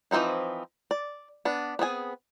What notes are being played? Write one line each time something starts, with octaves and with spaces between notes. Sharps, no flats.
E3 F3 C4 D#4 E4
D5
B3 D4
B3 C4 G#4 G#5